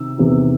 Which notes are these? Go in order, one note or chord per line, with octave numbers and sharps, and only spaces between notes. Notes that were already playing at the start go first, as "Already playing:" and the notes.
Already playing: C3 D#3 E6
E2 C3 D#3